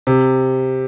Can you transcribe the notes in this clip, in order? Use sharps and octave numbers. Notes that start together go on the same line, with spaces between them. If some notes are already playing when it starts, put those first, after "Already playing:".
C3